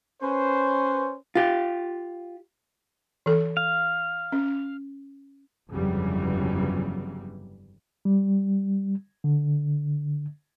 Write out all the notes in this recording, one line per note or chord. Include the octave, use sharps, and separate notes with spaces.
C#4 B4 C5
F4 G4
E3 A4
F5
C#4
G1 F2 C#3 E3 F#3 G3
G3
D3